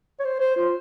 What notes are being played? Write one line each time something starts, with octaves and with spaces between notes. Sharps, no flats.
C#5
C5
C5
F4